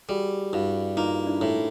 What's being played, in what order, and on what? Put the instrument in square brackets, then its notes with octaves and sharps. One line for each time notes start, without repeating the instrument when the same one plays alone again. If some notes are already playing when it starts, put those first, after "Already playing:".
[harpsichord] G3 [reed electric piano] F#4 G#4
[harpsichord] G2 [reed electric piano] E4 F#4
[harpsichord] A#3 [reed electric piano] D#4 F4
[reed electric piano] D4 E4
[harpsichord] A2